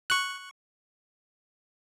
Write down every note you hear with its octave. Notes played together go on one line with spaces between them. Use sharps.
C#6 F#6